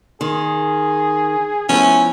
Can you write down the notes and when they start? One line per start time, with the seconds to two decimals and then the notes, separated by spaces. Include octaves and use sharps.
0.21 D#3 G#4 C6
1.69 F3 A3 B3 C#4 E4